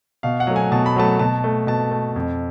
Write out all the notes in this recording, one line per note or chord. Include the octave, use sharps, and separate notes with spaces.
B2 F5
F#5
F#3 A3
G#5
B2 A5
B5
F#3 A3 A5
B2 A5
A3
B2 A5
A3
F2